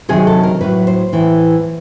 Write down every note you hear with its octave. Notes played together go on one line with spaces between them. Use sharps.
C3 D#3 F#3 G#4
A4
A#4
A2 F#3 B4
C5
A2 E3